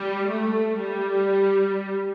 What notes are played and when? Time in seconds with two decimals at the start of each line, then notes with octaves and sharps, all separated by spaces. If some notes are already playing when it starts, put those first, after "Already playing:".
Already playing: G3
0.27 A3
0.80 G3